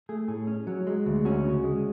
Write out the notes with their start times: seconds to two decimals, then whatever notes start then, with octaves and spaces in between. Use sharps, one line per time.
0.09 A3 G#4
0.28 A2 G#4
0.47 C#4
0.67 F#3
0.87 G#3
1.06 D2
1.25 C#4 F#4
1.45 C#3
1.64 G#3